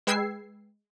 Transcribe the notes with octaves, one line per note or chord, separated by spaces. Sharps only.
G#3 B4 G5 E6 G#6 C7